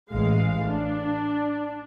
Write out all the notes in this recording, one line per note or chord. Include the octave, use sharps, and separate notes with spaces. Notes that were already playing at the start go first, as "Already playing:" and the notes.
A1 G#3 F5
D4